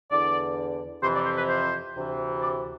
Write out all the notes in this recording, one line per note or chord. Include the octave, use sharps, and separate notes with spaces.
E2 D3 D5
F2 C3 E3 C5
D5
C5
B4
C5
D2 C3 E3
D5